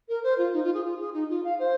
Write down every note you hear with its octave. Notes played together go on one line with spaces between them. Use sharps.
A#4
C5
F4
D#4
F4
G#4
F4
G#4
D#4
F4
F5
C5